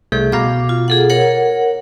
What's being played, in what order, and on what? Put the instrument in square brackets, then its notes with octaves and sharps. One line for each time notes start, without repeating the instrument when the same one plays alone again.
[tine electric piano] C2 A3 G6 [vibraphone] G#4
[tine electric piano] B2 F5 A#5 [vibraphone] D6
[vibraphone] F4
G#4 A4 F#5
A#4 C#5 F#5